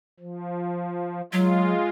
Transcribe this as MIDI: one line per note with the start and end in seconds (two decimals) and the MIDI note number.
0.20 1.21 53
1.33 1.72 54
1.33 1.90 56
1.33 1.90 65